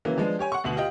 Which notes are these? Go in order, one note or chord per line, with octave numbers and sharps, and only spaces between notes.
C#3 E3 F#3 A#3
F3 G#3 B3 D4
G4 C#5 G#5
F#5 C#6
D2 B2 F#7
F4 G4 D#5 G5